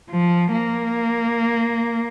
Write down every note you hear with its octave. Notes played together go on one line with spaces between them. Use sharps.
F3
A#3